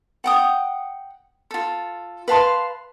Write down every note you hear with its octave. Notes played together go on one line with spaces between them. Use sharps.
F#5 G5 D#6
F4 A4
B4 F5 A5 C6